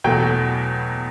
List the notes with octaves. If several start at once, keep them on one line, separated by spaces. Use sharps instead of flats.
E2 B2 F#3 A3 G5